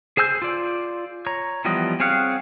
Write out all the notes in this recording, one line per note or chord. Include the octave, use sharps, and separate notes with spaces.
G#4 C5 G#5 E6 G6
F4 D5
C#5 A#5
E3 F3 G3 B3 D#5
C4 G#4 C#5 F5 F#5